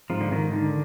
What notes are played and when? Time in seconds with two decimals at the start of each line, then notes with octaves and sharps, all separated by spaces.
0.10 G#2 F3
0.21 D3
0.31 G#2 D#3
0.52 D3 D#3